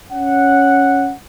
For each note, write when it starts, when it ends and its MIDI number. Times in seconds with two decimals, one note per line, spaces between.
0.12 1.12 61
0.12 1.12 78